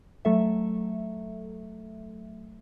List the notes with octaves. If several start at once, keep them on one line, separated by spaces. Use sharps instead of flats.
F#3 A3 A4 E5